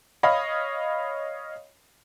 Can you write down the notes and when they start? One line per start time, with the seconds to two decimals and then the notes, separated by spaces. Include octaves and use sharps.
0.23 C#5 D#5 F5 B5